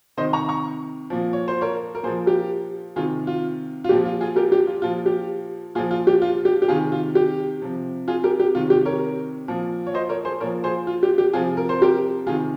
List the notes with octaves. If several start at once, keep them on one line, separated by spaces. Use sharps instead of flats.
C3 D#3 C5 D#5
A#5 C#6
A#5 C#6
A#2 F3
C#5
C5
A#4 C#5
A#4
A#2 F3 G#4 C5
G4 A#4
C3 D#3 F4 G#4
F4
F4
A#2 F3 G4
F4
F4 G#4
G4 A#4
G4
F4
A#2 F3 F4
G4
A#2 F3 F4 G#4
F4
G4
F4
G4
G4
C3 D#3 F4 G#4
F4
G4
C3 F3
F4 G#4
G4 A#4
G4
C3 D#3 F4
G4
A#4 C#5
A#2 F3
C#5
C5 D#5
A#4 C#5
G#4 C5
A#2 F3 A#4 C#5
G#4 C5
F4
G4
G4
C3 F3 F4 G#4
A#4
C5
G4 A#4
C3 D#3 F4 G#4